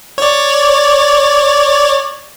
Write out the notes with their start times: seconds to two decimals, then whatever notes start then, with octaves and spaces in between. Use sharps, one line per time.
0.18 C#5 D5